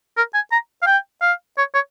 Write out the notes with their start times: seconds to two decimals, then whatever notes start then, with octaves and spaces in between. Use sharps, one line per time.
0.17 A#4
0.34 G#5
0.52 A#5
0.82 F5
0.86 G5
1.22 F5
1.58 C#5
1.74 C#5